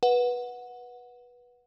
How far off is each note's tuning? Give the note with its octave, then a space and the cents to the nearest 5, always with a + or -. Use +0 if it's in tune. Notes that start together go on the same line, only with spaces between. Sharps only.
B4 -15 F#5 -10